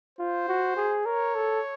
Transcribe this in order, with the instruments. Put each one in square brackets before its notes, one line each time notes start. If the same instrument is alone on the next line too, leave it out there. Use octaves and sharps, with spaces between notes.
[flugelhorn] F4 [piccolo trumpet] C5
[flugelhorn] F#4
G#4
[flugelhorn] A#4 [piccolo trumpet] C#5
[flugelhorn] A4